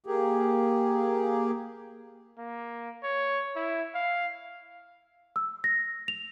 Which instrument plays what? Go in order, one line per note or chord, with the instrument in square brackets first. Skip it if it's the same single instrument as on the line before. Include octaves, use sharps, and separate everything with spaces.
[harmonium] A#3 G4 G#4
[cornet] A#3
C#5
E4
F5
[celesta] E6
A#6
F7